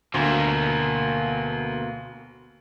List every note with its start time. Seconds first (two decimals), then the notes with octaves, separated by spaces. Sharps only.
0.14 D2 B2 A#3